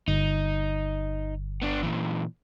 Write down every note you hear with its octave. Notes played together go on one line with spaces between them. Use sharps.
G1 D#4
B3 D4
A#2 E3